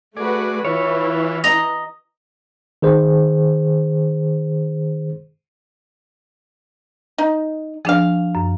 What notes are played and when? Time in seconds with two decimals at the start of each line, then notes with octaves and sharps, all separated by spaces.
0.17 A3 F#4 G#4 B4 D5
0.65 E3 F4 B4 C#5 E5
1.44 D#5 A#5
2.82 D#3 G#4 C5
7.18 D#4
7.85 F3 D4 G#4 F5
8.35 F#2